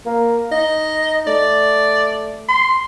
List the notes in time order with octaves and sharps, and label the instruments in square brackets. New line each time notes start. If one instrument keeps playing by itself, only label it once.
[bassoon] A#3
[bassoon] D#4 [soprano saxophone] D#5
[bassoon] A3 [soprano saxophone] D5
[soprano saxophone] C6